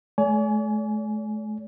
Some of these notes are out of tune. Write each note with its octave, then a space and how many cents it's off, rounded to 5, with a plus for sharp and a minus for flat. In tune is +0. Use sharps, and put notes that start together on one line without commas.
A3 -40 D5 -45 G#5 +15